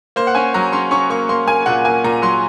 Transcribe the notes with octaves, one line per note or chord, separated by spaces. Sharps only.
A#3 C5
F#5
C#4 G#5
F#3 A#5
C#4 C6
C#4 C#6
A#3 C#6
A#3 C6
A#3 G#5
A#2 F#5
A#3 G#5
A#2 A#5
F#3 C6